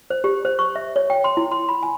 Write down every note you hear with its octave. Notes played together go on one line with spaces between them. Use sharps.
C5
G4
C5
C#6
E5
C#5
G5
C6
E4
C6
B5
G#5